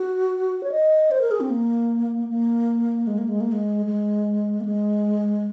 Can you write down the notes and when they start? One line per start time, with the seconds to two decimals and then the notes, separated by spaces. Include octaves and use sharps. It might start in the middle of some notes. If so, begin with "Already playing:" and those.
Already playing: F#4
0.63 C#5
0.72 D#5
1.11 C5
1.21 A#4
1.31 G#4
1.41 C4
1.50 A#3
2.29 A#3
3.07 G#3
3.18 A#3
3.29 G#3
3.41 A#3
3.52 G#3
3.86 G#3
4.60 A#3
4.65 G#3